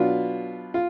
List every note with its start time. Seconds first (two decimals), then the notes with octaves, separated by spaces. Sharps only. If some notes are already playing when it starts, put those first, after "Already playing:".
Already playing: B2 F#3 B3 D4 F4
0.74 F4